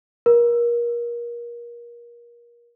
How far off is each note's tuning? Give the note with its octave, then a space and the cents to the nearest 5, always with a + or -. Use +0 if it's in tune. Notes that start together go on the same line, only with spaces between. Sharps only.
A#4 +30